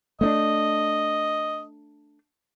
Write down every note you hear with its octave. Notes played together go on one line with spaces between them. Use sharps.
A3 C#4 D4 D#5